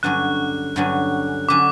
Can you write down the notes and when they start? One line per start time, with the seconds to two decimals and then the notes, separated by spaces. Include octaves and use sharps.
0.03 G2 D3 F#3 C#4 F#6
0.76 G2 D3 F#3 C#4
1.49 D3 F#3 C#4 D6